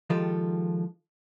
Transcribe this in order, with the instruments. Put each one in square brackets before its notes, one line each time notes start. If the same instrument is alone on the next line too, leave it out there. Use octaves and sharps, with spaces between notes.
[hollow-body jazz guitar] D#3 F3 G#3 F4 G4 A4